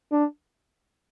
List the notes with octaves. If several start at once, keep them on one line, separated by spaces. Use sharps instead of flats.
D4